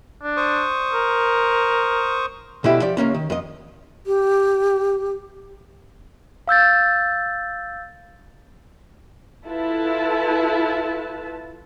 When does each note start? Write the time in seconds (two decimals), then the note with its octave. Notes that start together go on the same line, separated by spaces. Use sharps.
0.23 D4
0.37 C5 C#6 D#6
0.93 A#4
2.64 B2 D3 A3 E4 G4
2.81 F3 G4 D5
2.97 C#2 A#3 C#4 A#5
3.14 D#3
3.30 F2 D#5
4.07 G4
6.48 F5 E6 G6 A6
9.45 E4 F4 A4 B4 A5